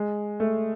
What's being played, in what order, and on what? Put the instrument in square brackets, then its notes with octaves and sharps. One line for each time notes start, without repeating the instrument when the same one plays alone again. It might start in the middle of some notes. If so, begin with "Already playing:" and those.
Already playing: [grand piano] G#3
A3